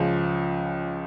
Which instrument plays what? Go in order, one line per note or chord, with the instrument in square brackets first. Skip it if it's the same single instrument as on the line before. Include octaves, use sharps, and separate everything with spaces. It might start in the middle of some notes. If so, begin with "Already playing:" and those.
Already playing: [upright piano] C#2 C#3 F3